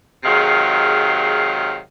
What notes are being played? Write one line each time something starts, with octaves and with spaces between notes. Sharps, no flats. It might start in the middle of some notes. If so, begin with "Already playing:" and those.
C3 D#3 F#3 G#3 G#4 F5